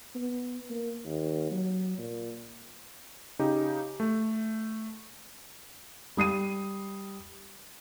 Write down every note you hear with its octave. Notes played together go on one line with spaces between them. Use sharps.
B3
A#3
D#2
F#3
A#2
C#3 D#4 G4
A3
G3 D#6 C7 D#7